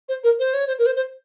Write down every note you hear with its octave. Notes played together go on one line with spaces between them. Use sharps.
C5
A#4
C5
C#5
C5
A#4
C5
C5